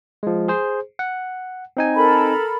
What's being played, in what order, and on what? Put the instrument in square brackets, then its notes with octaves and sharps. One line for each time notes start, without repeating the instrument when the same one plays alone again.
[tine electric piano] F3 G#3
G#4 C5
F#5
C4 D#4 G#5
[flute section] A4 A#4 B5